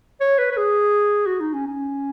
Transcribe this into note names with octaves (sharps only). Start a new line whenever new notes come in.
C#5
B4
B4
G#4
F#4
D#4
C#4
C#4